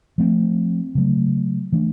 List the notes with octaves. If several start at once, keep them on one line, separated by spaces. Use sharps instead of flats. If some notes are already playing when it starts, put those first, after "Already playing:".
F3 A3 C4
C#3 F#3 A3
E3 A3 D4